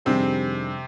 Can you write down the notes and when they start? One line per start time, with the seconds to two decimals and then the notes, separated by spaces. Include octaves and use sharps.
0.05 F2 C3 D#3 G3 C4 D4 G#4